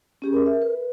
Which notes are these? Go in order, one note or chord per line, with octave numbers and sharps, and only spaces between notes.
C#4 G4 G#4
A#4
E5
B4